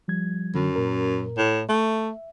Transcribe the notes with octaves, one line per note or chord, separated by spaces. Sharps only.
F3 G3 G#6
F#2 D3 F#3
A#2 A#4
A2
A3 E5